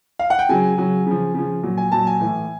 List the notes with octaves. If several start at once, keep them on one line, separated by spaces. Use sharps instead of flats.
F5
F#5
G5
C#3 F#3 G#5
C#3 F#3
C#3 F3
C#3 F3
A#2 F#3
G#5
A#2 F#3 A5
G#5
A2 E3